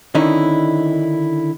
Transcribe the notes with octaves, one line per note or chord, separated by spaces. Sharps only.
D3 D#3 C#4 D#4 E4